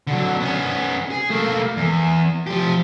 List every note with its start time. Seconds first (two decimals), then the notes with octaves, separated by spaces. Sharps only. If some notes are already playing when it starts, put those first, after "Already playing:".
0.07 D3 F#3
0.40 B3 C#4
1.11 G#4
1.30 A3 A#3
1.77 E2
2.47 F3 G4